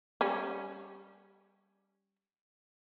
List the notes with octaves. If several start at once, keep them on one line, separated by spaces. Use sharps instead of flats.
G3 C#4